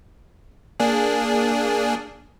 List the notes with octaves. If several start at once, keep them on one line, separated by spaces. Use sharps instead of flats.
A#3 D4 G#4